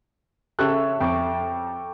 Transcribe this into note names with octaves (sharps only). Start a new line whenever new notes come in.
C#3 G4 A4 C#5 E5 F#6
F2 G5 C#6 D6